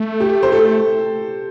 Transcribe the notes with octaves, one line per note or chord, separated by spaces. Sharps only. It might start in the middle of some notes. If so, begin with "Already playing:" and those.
Already playing: A3
G4
C5
A4